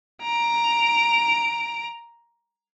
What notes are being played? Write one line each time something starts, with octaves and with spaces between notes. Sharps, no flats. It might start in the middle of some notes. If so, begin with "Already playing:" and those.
A#5 D7